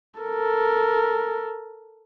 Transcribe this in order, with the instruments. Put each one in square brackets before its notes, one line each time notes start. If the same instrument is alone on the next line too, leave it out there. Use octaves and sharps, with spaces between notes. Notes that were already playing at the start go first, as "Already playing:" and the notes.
[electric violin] A4 A#4